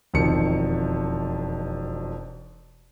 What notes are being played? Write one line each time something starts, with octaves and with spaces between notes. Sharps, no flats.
E1 F2 D#3 C#7